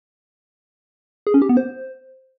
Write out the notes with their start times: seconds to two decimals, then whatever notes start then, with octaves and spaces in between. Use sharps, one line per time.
1.27 G#4
1.34 C#4
1.42 G4
1.49 B3
1.57 C5